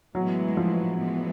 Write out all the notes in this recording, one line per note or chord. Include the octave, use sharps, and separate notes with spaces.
A2 E3 F#3 G#3 B3 E4
F3
E3 G#3 B3